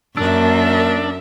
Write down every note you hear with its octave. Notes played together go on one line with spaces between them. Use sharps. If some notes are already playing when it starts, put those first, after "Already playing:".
F#2 A#3 D4 A#4 E5 E6